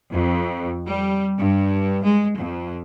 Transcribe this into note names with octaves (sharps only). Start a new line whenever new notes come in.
F2
G3
G2
G#3
F2